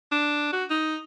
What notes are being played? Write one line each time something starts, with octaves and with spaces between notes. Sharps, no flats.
D4
F#4
D#4